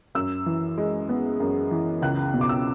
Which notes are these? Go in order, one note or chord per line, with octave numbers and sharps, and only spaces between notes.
F#2 E6
E3
G#3
B3
F#2
E3
C#2 F#6
B2
D6
E6